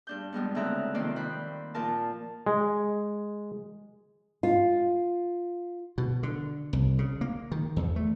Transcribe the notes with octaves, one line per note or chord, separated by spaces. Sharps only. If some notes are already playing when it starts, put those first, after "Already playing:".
G2 D4 G6
F2 G3 G#3 B3
D2 C#3 C4 E5 A#5 F#6
F2 C3 D#3 A#3 C5 D5
D#2 C5 B5 F#6
A#2 F3 F4 A#4 A5
G#3
F4
B2
D3
C2
C#3
A#3
D#3
E2
A3